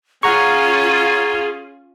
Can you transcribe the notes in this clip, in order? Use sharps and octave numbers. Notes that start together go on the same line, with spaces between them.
C#4 F4 G#4 F#5 A#5 C#6 G#6